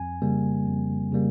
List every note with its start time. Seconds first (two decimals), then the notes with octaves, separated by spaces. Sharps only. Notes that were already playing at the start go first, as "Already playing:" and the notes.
Already playing: F2 G#5
0.22 C#3 G3 A#3
0.67 F2
1.12 C#3 G3 A#3